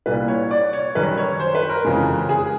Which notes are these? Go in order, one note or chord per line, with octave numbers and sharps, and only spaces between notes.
C2 A#2 G3 B4
C#5
D5
C#5
F#2 D#3 G3 B4
C#5
C5
B4
A#4
F2 C#3 E3 G#3
G#4